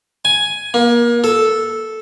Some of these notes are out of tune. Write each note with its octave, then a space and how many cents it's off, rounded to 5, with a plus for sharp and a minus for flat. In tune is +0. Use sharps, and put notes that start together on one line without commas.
G#5 +5
A#3 +30
A4 -5